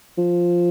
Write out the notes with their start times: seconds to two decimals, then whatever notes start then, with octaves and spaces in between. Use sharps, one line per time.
0.18 F3